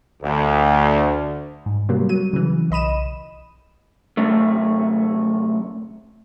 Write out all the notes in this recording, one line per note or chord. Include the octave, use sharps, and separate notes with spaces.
D2
G#2
C3 F#3 G3 A#3
F#3 D#7
C#3 E3
B1 D#5 B5 D#7 E7
F#2 C3 A3